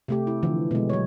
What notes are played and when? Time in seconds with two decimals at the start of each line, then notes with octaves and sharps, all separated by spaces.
0.08 C3 A3 G4
0.27 E4
0.43 D3 E3 F3
0.71 B2 G#3
0.90 F#3 C#5